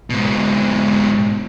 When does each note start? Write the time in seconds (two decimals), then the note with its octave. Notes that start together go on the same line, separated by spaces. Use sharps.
0.10 G#2 B2